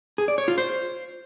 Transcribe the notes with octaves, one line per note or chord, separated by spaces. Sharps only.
G#4
D5
C#5
F4
C5